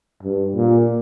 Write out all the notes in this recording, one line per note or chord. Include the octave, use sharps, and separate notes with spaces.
G2
A#2